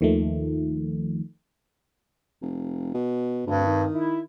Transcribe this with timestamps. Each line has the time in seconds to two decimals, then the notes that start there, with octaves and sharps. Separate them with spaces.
0.01 D#2 D#3 F3 A3
2.42 F1
2.94 B2
3.47 D2 G2 C4
3.66 D#3
3.95 E4